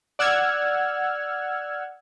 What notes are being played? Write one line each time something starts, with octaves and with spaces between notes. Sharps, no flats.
D5 F#5 E6 F6 G#6